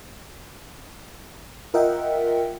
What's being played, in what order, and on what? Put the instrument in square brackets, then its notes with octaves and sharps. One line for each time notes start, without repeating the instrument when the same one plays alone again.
[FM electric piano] F4 A#4 D#5 E5 F#5 G5